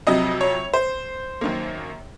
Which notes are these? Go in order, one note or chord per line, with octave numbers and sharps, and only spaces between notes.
F2 C3 F#3 D#5
C#5
C5
F#2 D#3 A#3